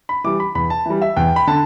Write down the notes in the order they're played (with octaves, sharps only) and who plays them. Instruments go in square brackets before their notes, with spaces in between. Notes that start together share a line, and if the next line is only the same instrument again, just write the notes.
[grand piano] B5
E3 G3 D6
B5
E2 B5
A5
E3 G3
E5
E2 G5
B5
D3 A5